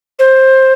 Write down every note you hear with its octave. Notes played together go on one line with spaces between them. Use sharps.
C5